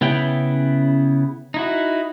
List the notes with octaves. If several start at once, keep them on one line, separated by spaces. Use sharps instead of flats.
C#3 B3 C#4 E4 G5
D#4 E4 F#4